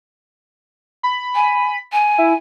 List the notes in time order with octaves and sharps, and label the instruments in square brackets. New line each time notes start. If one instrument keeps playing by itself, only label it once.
[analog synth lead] B5
[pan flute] G#5
G#5
[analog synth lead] E4